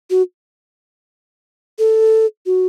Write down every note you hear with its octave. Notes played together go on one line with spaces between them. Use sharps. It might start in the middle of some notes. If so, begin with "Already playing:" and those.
F#4
A4
F#4